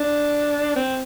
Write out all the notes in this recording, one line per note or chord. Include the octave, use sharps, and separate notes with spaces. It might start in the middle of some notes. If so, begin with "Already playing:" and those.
Already playing: D4
C4